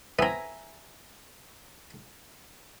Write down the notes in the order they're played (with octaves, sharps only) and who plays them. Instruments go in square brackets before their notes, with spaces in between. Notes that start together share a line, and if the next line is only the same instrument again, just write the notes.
[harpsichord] B3 C4 [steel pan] E5 G#5 A#5